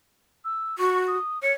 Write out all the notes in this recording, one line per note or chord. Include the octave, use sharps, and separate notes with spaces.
E6
F#4 C#6
D#6
C#5 C#7